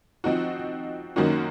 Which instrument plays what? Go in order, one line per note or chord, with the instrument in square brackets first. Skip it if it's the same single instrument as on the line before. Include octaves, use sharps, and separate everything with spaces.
[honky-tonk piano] F3 C4 D#4 F#4
F#2 D#3 A#3 C#4 F#4